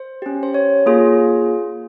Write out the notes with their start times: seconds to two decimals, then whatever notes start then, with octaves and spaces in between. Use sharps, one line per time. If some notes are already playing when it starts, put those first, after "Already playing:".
Already playing: C5
0.22 C#4 G4
0.43 C5
0.54 C#5
0.86 A#3 F4 G#4